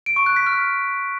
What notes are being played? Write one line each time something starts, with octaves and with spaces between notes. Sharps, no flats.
D7
C#6
F#6
B6
F6